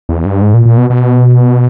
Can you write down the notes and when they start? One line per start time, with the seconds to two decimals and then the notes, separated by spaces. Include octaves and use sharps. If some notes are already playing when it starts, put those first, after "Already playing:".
0.09 E2
0.26 G2
0.42 G#2
0.54 A#2
0.65 A#2
0.77 B2
0.90 B2